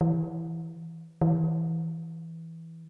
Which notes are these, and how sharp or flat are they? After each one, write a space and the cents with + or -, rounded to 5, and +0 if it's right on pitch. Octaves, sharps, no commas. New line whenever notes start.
E3 +0
E3 -10